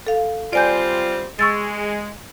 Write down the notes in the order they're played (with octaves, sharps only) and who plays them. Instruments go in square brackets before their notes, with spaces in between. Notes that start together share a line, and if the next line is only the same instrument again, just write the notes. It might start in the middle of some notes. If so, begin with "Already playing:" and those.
[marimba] A4 F5
[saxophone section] G3 C4 F4 [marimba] D5 G#5 G6
[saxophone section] G#3 [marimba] C#6 E6 A6